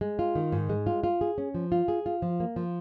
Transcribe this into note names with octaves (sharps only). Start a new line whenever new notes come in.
G#3
F4
D#3
G#2
G#3
F4
F4
G#4
C#4
F3
F4
G#4
F4
F3
A#3
F3